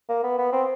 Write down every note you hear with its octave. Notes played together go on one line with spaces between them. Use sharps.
A#3
B3
B3
C4